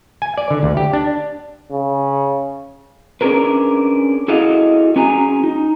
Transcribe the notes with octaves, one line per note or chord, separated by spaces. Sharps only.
G#5
D5
D3
D2
G4
D4
C#3
C#4 D4 G#4 A#4 B4
E4 F#4 G#4 A4 D#5 F5
C#4 F#4 G#4 G#5 A#5
D#4